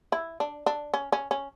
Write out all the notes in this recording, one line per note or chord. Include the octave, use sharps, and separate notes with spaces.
E4
D4
D4
C#4
C#4
C#4